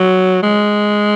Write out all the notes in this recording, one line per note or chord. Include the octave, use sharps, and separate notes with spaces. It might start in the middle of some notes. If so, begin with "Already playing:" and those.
Already playing: F#3
G#3